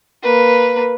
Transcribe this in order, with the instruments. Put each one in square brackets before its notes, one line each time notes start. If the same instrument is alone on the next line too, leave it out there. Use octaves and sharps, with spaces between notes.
[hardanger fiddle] A#3 B4